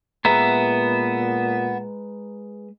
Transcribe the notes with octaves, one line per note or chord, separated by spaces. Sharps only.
A#2 G#3 B3 B4 E5 A#5